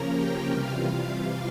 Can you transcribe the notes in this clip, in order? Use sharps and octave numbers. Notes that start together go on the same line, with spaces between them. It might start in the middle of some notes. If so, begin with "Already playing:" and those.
Already playing: C#3 F3 A#3 C#4 A#4 A#5
G4 G5
C3 E3 G3 F4 F5